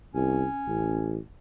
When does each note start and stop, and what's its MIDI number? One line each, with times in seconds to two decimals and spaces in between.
0.15 0.46 36
0.15 1.21 61
0.67 1.18 33